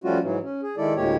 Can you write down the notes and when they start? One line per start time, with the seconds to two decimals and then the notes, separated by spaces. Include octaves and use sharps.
0.04 F3 G3 A3 C#4 F4 F#4
0.23 G#2 E3 F#3
0.43 C#4
0.63 G#4
0.77 D#3 G#3 E4 A4 D5
0.96 D2 A2 G#3 A#3 G4 C#5